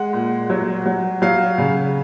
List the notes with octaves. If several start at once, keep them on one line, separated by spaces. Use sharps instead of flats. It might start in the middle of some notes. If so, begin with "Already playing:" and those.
Already playing: G#3 F#5
A#2
F#3
F#3
F#3 F5
C#3